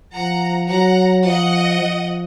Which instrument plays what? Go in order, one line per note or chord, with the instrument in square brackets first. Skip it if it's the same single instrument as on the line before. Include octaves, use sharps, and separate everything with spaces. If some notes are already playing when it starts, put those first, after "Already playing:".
[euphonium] F3 [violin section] F#5 A#5
[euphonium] F#3 [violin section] F#5 A#5
[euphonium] F3 [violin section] D#5 F#5
[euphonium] F3